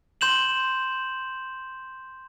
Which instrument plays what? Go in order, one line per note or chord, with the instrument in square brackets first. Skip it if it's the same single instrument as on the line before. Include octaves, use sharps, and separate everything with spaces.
[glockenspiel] C6 G6 E7 F#7